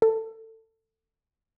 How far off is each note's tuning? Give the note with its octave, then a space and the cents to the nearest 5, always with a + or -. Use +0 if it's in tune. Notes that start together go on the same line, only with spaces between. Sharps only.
A4 +20